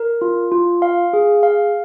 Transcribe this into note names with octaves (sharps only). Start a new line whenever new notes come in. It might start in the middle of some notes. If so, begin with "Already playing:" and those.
Already playing: A#4
F4
F4
F5
G#4
F5